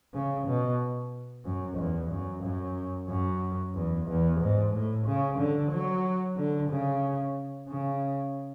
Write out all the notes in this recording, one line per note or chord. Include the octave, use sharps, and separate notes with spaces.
C#3
B2
F#2
E2
F#2
F#2
F#2
E2
E2
G#2
A2
C#3
D3
F#3
D3
C#3
C#3